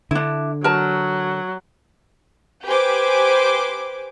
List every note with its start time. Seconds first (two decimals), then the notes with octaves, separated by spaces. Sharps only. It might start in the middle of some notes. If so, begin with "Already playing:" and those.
0.11 D3 D4 E4
0.64 F#3 A#4 A5
2.65 G4 B4 C5 G#5 D6